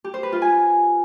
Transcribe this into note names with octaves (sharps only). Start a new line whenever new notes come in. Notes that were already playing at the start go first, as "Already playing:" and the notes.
G4
C5
B4
F4
G#5